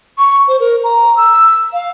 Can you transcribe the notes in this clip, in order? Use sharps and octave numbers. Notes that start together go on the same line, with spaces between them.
C#6
C5
A#4
A#5
E6
F5